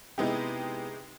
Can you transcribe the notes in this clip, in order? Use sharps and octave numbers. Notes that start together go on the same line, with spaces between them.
C3 G#3 B3 D#4 E4 G4